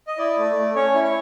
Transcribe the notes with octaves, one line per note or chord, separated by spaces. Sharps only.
D#5
E4 D5
A3
A3
C#4 C#5
E4
C#5